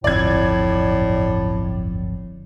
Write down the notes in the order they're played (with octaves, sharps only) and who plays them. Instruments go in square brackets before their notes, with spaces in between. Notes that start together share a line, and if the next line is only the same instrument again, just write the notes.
[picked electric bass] D1 G1 F2 [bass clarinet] A2 [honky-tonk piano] D5 G#6